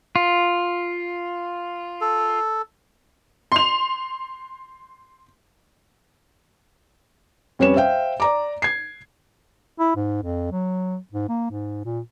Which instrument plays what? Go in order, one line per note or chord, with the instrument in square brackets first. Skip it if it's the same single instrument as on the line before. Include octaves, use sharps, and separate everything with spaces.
[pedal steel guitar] F4
[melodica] A4
[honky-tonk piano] C6 F7
[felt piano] F2 G3 C#4 B4 C#5 E7
C5 E5 F5 G5
D5 A#5 D6
G#6 C7
[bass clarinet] E4
G#2
F2
F#3
G#2
A#3
G#2
A#2